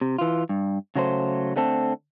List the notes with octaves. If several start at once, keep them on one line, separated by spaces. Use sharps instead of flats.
C3
E3 F4
G2
C#3 F#3 A3 C5
D3 A3 C4 A4